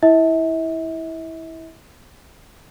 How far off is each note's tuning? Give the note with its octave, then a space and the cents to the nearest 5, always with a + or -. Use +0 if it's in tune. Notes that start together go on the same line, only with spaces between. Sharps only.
E4 -10 E5 -40